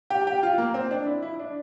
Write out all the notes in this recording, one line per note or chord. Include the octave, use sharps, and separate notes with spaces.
G4
G4
F4
A#3
C4
D4
E4
E4
D4